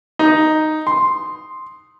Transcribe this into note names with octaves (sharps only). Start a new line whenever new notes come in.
D#4
C6